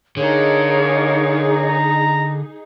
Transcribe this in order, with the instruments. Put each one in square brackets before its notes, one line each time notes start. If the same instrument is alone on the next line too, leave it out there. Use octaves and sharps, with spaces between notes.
[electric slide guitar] D3 [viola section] D#4 G#4 [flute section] A#4 C#5 F5
[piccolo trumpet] A#5